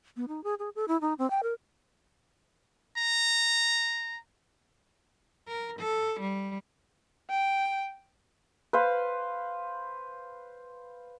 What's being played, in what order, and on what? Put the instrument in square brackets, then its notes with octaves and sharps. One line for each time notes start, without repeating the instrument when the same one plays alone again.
[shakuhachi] B3
D#4
G#4
G#4
A4
E4
D#4
C4
G5
A#4
[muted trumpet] A#5
[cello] A#4
A4
G3
[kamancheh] G5
[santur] B4 C5 F5